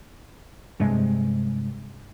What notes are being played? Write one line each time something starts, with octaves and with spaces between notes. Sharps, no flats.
G2 C3 G#3